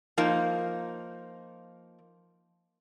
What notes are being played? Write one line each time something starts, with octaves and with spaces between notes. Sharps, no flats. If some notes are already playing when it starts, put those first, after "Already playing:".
F3 A#3 D#4